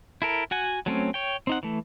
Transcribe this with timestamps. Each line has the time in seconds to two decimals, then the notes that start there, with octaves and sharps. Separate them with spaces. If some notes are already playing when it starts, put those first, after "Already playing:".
0.22 E4 A4 A#4
0.51 F#4 F#5 G#5
0.86 F#3 A3 C4 C#4
1.14 C#5 G5
1.47 C4 D#4 F#5
1.63 E3 A3